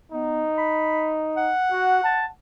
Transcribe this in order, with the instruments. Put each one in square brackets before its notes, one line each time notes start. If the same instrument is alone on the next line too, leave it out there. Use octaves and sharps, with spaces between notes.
[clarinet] B3 [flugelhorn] D#4
[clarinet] B5
F#5
[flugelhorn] F#4
A5